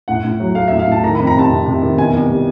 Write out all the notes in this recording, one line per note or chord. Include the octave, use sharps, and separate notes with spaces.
A2 F#5
A2
F#3
A3 F5
A2 E5
F5
A2 A5
D#3 A#5
F2 B5
A#5
C3 A5
C3
C3
D#3
B2 G#5
C2
G3